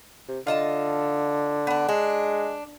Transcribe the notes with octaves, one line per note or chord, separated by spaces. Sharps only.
C3
D3 F4 D#5 A5
B3 D4
G#3 D4